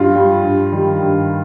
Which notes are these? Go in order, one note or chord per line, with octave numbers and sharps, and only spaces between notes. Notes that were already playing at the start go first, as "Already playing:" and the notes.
Already playing: G2 G3 F4
G3
G2
D#3 G3
G2